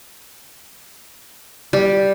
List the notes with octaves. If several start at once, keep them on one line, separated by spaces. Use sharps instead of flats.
G3